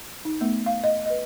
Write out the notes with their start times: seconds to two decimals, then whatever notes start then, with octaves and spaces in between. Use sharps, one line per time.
0.25 D#4
0.41 A3 B3
0.66 F5
0.84 D#5
1.06 B4 D#5